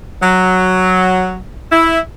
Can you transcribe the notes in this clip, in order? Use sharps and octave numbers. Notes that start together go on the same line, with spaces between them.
F#3
E4